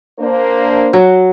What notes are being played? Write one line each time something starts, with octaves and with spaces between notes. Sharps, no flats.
A#3 D4 C5
F#3